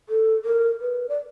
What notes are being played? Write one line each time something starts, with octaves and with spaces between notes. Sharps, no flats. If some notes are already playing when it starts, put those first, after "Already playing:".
A4
A#4
B4
D5